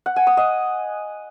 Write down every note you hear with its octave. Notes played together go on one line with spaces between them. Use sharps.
F#5
G#5
D#6
D#5